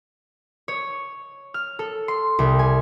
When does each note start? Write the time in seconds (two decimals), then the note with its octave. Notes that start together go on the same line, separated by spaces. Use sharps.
0.68 C#5
1.54 F6
1.79 A4
2.08 C6
2.39 C2
2.59 G#5